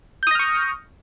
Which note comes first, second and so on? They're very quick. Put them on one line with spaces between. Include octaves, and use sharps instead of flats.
G6 D#6 A#6 F6 C#6